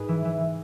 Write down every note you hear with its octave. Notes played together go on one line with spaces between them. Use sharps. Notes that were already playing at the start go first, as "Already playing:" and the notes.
Already playing: G#2 G#4 B4 G#5
E3
E3
E3